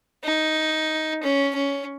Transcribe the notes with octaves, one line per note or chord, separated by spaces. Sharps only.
D#4
C#4
C#4